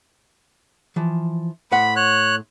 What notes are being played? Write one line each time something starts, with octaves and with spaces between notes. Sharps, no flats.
E3 F3
A2 C5 F#5 B5
C#5 F#6